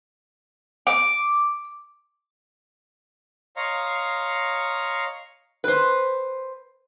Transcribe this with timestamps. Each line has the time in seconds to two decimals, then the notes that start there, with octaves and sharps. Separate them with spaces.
0.87 D6
3.56 C#5 D#5 F5 A#5 C6 C#6
5.64 B4 C5